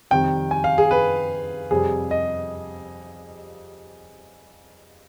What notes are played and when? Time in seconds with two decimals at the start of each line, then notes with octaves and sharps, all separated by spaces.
0.11 F2 C3 D#3 G3 G5
0.51 G#5
0.64 F5
0.78 G#4
0.91 B4
1.71 F2 C3 G3 G#4
2.11 D#5